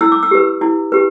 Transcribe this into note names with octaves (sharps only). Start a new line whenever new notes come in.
E4 E6
D6
E6
G4 B4
E4
G4 B4